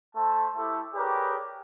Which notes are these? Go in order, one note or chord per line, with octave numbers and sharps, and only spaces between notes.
A3 A4 C5 A5
A3 E4 G4 A4
G4 G#4 A#4 B4 C#5 D5